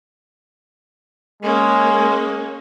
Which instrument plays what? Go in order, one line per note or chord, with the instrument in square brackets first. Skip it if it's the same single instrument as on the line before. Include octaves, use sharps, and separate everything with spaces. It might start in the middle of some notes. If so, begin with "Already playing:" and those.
[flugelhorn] G#3 [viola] A#3 C#4